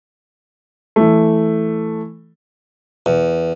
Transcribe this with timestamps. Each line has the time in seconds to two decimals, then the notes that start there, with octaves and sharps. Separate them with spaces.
0.96 E3 A3
3.06 E2